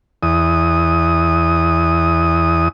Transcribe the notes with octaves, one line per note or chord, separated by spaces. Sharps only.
E2 D#6